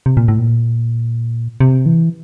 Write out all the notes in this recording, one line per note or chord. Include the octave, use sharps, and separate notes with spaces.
C3
A#2
A2
A#2
C3
E3